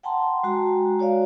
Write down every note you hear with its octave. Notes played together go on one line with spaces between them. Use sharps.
F#5 G5 A5 A#5 C6
G#3 F#4 A#5
F#4 C#5 D5 F5